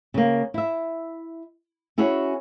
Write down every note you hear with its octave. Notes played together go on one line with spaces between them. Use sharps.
C#3 A#3
E4 E5
C#4 E4 F#4 G#4 C#5